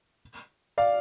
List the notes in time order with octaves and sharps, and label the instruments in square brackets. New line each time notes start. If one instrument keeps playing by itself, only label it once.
[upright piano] D5 F5